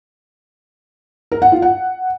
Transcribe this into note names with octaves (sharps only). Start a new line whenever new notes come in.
A#4
F#5
F4
F#5